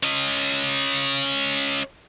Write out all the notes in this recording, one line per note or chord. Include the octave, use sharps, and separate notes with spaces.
C#4 D#5